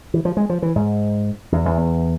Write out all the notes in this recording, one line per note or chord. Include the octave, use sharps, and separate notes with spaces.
E3
F3
G#3
F3
E3
G#2
E2
E2
E2